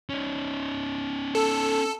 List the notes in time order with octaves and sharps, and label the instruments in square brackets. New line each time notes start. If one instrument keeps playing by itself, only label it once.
[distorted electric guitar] C#4 D#4
[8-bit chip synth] A4